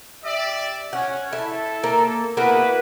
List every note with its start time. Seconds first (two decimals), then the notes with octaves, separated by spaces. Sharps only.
0.24 G4 D5 E5
0.93 C#4 F#5
1.33 E4 A4
1.84 A#3
2.37 A#3 B3 E4 F#4 B4